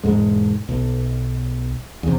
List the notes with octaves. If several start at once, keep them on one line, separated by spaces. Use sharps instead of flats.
E1 F2 G#2 G#3
B1
E2 C3